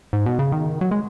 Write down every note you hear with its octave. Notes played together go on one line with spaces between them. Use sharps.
G#2
B2
C#3
D#3
F#3
G#3